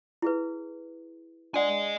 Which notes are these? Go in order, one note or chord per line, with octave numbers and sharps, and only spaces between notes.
E4 G#4 B4
D4 D5 D#5 F#5 G#5